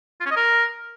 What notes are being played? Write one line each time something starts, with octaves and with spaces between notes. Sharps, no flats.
F4
C#4
D#5
A#4